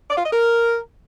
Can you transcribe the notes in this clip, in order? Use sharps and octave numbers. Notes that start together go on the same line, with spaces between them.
D5
F4
D#5
A#4